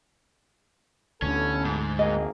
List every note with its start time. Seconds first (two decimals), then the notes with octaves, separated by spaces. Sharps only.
1.22 A1 D2 D3 B3 C#4 A4
1.65 G#2
1.99 G#1 A#3 G#4 D#5